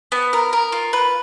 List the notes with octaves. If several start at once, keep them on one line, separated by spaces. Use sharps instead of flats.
B3
A#4
A#4
F4
B4